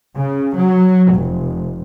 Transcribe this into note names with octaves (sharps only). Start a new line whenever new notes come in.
C#3
F#3
F1